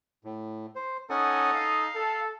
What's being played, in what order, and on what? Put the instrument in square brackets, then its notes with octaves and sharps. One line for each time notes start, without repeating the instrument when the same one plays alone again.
[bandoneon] A2
C5
[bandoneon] C#4 F#5 G#5 [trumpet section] D#4 A4 D#6
[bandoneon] F5
[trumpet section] A4